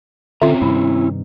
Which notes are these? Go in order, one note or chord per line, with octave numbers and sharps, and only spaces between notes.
D3 C4 C#4 F4 E5 A#5
G2 C3 D#3 E4